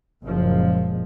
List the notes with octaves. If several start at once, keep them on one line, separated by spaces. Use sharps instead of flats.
F#1 A#2 F3 G#3